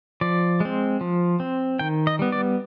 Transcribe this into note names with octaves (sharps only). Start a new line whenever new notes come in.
F3 D5
G#3 C4
F3
C4
D#3 G5
D#5
G3 B3
D5